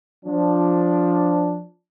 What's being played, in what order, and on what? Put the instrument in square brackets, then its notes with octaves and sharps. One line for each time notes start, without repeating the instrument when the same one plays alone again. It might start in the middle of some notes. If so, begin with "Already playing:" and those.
[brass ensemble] F3 D4